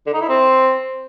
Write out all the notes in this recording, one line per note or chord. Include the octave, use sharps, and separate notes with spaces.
D3
D#4
E4
C4